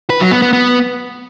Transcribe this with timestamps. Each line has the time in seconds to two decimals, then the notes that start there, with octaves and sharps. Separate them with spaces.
0.10 B4
0.21 F#3
0.31 B3
0.42 B3
0.53 B3